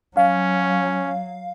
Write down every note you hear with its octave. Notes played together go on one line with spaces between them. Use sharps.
F#3 C#4 F5